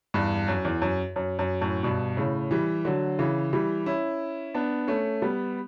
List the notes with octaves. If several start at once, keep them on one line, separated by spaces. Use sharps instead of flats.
E2 G2
F#2
E2
F#2
F#2
F#2
F#2 A2
G2 B2
A2 C#3
E3 G3
D3 F#3
C#3 E3
E3 G3
C#4 E4
B3 D4
A3 C#4
G3 B3